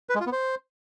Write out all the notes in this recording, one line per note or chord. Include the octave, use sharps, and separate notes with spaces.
B4
G#3
F4
B3
C5